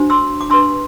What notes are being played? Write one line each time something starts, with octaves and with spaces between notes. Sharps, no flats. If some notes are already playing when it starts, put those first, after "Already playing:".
Already playing: D4 F#4 C5
C6 E6
D6
D4 G4 B4 C6 E6